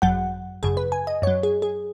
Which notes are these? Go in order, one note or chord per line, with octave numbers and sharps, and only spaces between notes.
G#1 F#2 F#3 F#5
G#1 F#2 C#3 G#4
B4
G#5
D#5
F#2 C#5
F#3
G#4
G#4